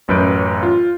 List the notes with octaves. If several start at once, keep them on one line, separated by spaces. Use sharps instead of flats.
A1 F#2 B4 G6 D7
F4